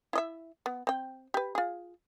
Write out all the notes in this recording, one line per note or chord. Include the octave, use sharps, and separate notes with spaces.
E4 D#5 E5
B3
C4 G5
G4 B4
F4 G#4